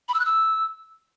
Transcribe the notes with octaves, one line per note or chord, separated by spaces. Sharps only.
B5
E6
F#6
E6